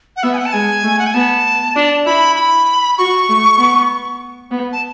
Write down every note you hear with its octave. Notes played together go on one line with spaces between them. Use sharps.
F#5
B3 E5
G#5
F#5
A5
G#3 G#5
A3
F#5
G#5
B3 A5
D4
E4 B5
B5
F#4 C#6
A3
B3
B3
A5